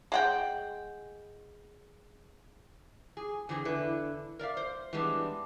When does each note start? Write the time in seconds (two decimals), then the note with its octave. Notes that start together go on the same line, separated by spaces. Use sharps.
0.12 G#3 F#5 G5
3.17 G#4
3.49 D3 E3 C4 G#4
3.65 E2 D3 E4 B4
4.39 A#4 D5 E5 F5
4.57 C5
4.93 E3 G3 G#3 B3 D4